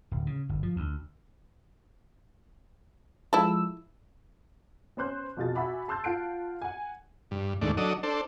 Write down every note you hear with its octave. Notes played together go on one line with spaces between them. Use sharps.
D1
C#3
G1
F3
D2
F3 G#3 E4 A4 E6
B3 C#4 C5 C6 F#6 G6
F2 B2 F4 G#4 D#5 A6
F#4 E5 F#5 G#5 B5 D6
A5 C6 E6 F#6 G6 A6
F4 F#5 A5 F#6 C7 D7
F#5 G#5
G2
D#2 G#2 A3 D4
F#3 D4 A4 D#5
D4 A4 C5